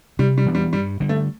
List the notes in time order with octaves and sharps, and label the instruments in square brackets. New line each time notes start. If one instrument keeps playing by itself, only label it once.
[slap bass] C3 [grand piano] G3
[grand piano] G3
[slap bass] E3 B3 D4
[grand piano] G3
[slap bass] G2 [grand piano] G3
[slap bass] D3 G3
[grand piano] A3